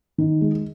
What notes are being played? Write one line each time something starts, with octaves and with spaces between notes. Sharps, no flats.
D#3
G#3